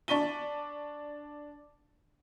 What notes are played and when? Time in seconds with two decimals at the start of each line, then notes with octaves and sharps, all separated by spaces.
0.08 D4 D5 C#6 B6 D#7 G7